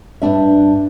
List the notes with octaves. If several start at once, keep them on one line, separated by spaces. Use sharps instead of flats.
G2 B2 D4 E5